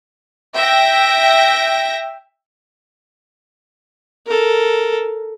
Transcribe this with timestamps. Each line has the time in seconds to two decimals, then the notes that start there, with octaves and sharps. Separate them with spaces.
0.55 E5 G5 A#6
4.27 A4 A#4